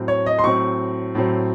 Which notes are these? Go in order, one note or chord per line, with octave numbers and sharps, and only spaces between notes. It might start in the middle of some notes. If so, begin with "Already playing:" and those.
Already playing: A2 F#3 C4
C#5
D#5
C6
A2 F#3 C4 C#6
A2 F#3 C4